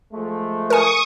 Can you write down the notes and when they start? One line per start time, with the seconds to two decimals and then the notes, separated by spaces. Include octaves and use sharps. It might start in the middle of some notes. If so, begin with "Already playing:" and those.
0.12 F3 G#3 A3
0.70 A#4 G#5 C#6 D#6